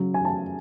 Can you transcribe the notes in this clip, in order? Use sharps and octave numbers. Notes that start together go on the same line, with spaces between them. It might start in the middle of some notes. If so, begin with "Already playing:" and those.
Already playing: C#3 F#3
G#5
A5